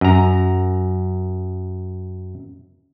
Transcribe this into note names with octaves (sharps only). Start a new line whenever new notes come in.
F#2 A#5